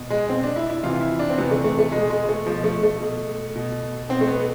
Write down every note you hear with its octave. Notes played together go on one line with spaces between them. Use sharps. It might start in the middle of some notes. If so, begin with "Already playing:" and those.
Already playing: B2
G#3
B2 C4
D4
E4
E4
C3 E3 F4
F4
E4
D4
C4
C3 E3 B3
A3
A3
A3
B2 G#3
G#3
G#3
A3
B2 F3
A3
A3
B2
B2
B2 C4
A3
B3